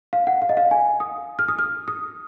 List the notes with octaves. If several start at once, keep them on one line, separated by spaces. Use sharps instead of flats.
F5
F#5
F5
D#5
F5
G#5
D#6
F6
D#6
F6
D#6